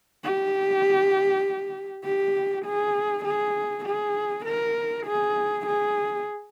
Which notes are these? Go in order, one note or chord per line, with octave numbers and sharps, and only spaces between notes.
G4
G4
G#4
G#4
G#4
A#4
G#4
G#4